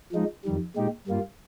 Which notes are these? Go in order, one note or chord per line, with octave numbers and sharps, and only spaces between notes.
F3 G#3 D#4
F2 D#3 G3
A#2 G#3 D#4 G4
G2 G3 A#3 F4